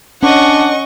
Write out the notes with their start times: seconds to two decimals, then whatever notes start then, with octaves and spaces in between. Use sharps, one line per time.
0.23 C#4 D4 D#5 F#5 C#6